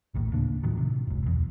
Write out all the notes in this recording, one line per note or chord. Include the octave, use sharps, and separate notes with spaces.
A#1 D#2 A2
D1 C#3 A#3 D4
A2 D#3 F3 F#3
C3
F#1 C#2
B1 E2